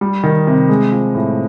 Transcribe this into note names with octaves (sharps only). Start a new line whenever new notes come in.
G3
D#3
C3
G#3
F3
A2